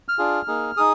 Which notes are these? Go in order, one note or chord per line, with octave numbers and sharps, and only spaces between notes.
F6
D4 F4 G#4
A#3 D#4 G#4
D#4 G#4 D#6